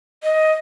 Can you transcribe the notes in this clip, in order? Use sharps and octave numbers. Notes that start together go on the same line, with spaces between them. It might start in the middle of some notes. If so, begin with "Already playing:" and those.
D#5